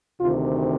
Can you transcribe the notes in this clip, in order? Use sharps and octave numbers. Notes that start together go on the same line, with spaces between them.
D2 C3 D#3 F4